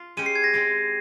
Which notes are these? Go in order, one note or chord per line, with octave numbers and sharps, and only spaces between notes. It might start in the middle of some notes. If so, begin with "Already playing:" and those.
Already playing: F4
G#3 C#4 G4 D#7
C7
G#6
A#6
G#3 C4 G4